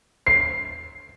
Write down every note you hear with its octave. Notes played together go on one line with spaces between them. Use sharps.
C7